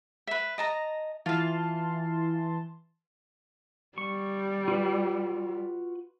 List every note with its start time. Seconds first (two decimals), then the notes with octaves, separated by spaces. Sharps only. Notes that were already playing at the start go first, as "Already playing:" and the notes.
0.27 B4 E5
0.58 D#5 A5 A#5
1.26 E3 F4 F5 A5 C6
3.98 G3 C#6
4.68 F4 F#4 B4